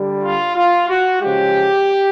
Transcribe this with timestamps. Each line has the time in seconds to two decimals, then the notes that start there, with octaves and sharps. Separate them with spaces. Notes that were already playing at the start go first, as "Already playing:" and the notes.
Already playing: D3 G3
0.23 F4
0.57 F4
0.89 F#4
1.21 C#3 F3 G#3 G4